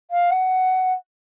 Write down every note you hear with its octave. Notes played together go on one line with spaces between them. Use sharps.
F5
F#5